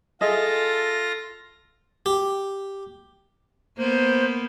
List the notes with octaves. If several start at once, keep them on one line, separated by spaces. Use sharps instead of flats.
F4 G#4 A4 D#5 E5 A#6
G4
A#3 B3 C5 G6